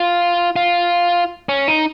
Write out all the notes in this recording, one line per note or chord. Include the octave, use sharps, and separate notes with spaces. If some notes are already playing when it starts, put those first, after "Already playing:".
Already playing: F4
F4
C#4
D#4